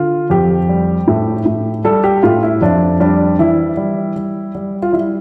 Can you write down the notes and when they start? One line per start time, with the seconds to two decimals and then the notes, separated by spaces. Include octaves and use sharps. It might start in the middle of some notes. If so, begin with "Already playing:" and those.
Already playing: D3 F4
0.30 F2 G4
0.69 G3
1.07 A2
1.46 A2
1.84 G3 A4
2.04 G4
2.23 A2 F4
2.43 E4
2.61 F2 D4
3.00 G3 D4
3.39 E3 E4
3.77 G3
4.16 G3
4.55 G3
4.82 F4
4.93 G3 E4